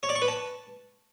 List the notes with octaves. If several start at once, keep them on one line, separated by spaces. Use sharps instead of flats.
C#5
D5
C#6
B4
A5